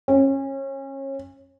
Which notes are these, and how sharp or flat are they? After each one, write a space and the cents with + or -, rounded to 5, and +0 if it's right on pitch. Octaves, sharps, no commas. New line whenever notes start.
C#4 -30